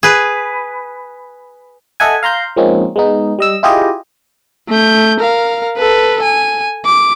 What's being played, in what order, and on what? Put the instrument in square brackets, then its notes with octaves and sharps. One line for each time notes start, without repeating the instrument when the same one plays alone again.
[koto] G#4 B4
[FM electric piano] A4 D#5 E5 F#5 G#5
F5 A#5 C6 G6
F3 G#3 A#3 C4 C#4 D#4
G#3 B3 D#4
G3 D#5 E6
E4 F4 G4 G#4 D#5
[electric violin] A3 G6
A#4 F5
A4 B4
G#5
D6